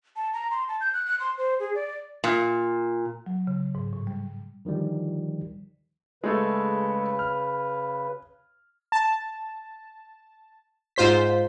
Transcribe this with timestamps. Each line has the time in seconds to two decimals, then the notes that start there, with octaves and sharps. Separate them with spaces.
0.16 A5
0.33 A#5
0.51 C6
0.68 A5
0.81 G6
0.94 F#6
1.06 F#6
1.20 C6
1.38 C5
1.60 G#4
1.75 D5
2.24 A#2
3.26 F#3
3.47 C#3
3.75 G#2
3.93 A2
4.07 G3
4.65 D3 D#3 F3 G3
6.24 C#3 G#3 A3 A4 B4
7.19 F6
8.92 A5
10.96 G#2 F4 C5 B6